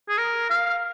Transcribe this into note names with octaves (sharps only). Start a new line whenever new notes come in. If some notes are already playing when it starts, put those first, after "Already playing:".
G#4
A#4
F5